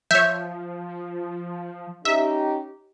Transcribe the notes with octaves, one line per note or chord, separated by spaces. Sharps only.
F3 C#5 E5 G6
C#4 D#4 G4 E5